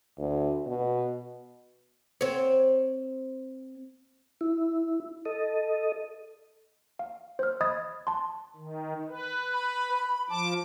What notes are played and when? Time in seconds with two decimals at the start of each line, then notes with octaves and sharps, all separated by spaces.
0.19 D2
0.66 B2
2.21 C4 C#5
4.41 E4
5.25 A4 D#5
6.99 F5
7.39 C5 F6
7.61 D#5 B5 D#6 G#6 A6
8.07 A5 C6
8.56 D#3
9.09 B4
9.53 B5
10.30 F3 A5 D6